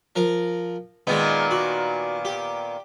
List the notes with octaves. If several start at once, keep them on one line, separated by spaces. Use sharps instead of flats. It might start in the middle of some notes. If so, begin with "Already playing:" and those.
F3 A#4
A#2 D#3 G#3 B3 D#4
F#4
G4